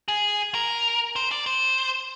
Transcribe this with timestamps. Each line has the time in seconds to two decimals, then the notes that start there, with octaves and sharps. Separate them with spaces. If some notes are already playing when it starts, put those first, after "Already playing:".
0.08 G#4
0.55 A#4
1.16 C5
1.32 D5
1.46 C5